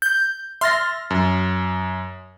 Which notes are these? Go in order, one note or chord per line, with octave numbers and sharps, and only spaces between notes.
G6
E5 C6 F6 A6 A#6
F#2